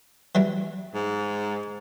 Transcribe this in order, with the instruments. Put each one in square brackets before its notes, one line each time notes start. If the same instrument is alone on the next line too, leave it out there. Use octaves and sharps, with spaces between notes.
[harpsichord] E3 F#3 G3
[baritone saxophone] G#2